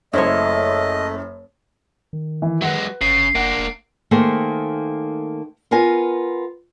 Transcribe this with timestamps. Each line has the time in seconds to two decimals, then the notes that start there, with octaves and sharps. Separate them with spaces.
0.13 F#1 F#2 A3 E4 C5 C#5 D#5
2.13 D#3
2.42 E3
2.61 F#3 G#3 B4 F#5
3.01 G1 C#3 C7
3.35 F#1 A#3 D4 F#5 D7
3.59 E1
4.11 D#3 A3 A#3 G#4 C5
5.71 B3 F4 A#4 G#5